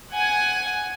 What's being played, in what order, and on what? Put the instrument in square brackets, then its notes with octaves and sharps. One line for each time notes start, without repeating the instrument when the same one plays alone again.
[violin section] F#5 G#5